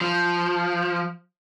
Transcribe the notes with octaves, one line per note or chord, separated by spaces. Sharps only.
F3